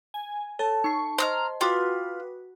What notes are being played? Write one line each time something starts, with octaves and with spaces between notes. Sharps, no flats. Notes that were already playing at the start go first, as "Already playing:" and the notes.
G#5
A4 C#5 A5
D#4 C#6 C7
C5 D#5 A#5 C6 E6 F6
F4 F#4 B4 G5 D6 D#6